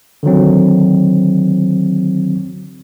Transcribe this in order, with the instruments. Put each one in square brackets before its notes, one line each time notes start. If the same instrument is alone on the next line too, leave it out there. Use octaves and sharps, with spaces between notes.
[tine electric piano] D3 D#3 F#3 C4